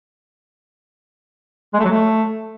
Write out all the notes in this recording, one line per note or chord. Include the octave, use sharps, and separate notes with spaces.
G#3
A3
F#3
A3